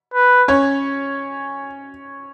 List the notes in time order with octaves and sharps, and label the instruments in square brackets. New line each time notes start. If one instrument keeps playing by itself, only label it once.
[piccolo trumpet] B4
[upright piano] C#4 C#5